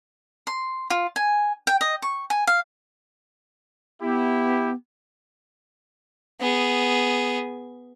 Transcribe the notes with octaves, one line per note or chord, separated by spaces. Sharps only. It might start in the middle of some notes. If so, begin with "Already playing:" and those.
C6
F4
G#5
G5
D#5
C#6
G#5
F5
B3 E4 G4
B3 G#4